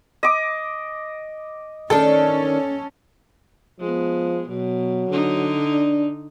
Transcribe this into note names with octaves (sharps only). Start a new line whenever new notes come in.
D#5 D6
D#3 C#4 D4 A4
F3 G#3 B3
B2 F#3
D3 D#4
D4